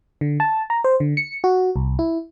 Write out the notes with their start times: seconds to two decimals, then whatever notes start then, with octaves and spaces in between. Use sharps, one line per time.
0.21 D3
0.40 A5
0.70 A#5
0.84 C5
1.00 D3
1.17 C#7
1.44 F#4
1.76 C2
1.99 E4